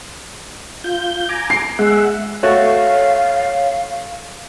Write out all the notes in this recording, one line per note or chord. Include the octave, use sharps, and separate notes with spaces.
F4 G6
G#5 A#5 D6
C7
G#3 E5 F#5
A3 F#4 C#5 F5